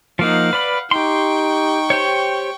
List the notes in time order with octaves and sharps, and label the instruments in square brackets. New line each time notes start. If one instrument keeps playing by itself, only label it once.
[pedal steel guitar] F3 A#3 D#4 [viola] F5 F#5
[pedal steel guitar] B4 D5 B5
[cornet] D#4 [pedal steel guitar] G4 C6 [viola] G5 C#6
[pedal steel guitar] G4 C5 C#5